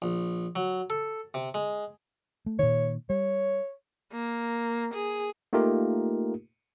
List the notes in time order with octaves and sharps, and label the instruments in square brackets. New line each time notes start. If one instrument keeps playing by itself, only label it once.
[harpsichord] A#1
F#3
A4
C3
G#3
[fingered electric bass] A3
[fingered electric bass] A#2 D#3 [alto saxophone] C#5
[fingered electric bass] G3 [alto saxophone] C#5
[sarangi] A#3
G#4
[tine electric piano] A3 A#3 D#4 F4 G4 A#4